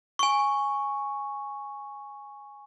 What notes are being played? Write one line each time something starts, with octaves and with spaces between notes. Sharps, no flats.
G#5 C#6